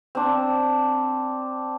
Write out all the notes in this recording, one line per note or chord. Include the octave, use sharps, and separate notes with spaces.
C4 D4